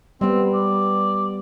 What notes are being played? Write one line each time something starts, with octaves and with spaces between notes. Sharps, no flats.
G3 B3 C4
D5